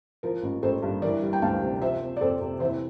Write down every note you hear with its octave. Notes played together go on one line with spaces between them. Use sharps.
F3 A#4
A1
A1 A4 C5
G2
E3 A#4 D5
G3
G5
D2 F5 A5
C3
F3 C5 E5
C4
D5
F2 A4 C5
C3
E3 C5 E5